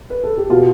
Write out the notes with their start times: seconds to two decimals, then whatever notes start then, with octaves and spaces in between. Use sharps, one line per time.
0.10 B4
0.24 A4
0.37 G4
0.50 B2 F4